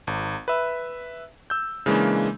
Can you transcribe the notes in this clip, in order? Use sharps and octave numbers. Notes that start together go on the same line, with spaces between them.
G#1
B4 E5
E6 G6
C#3 E3 G#3 A#3 D4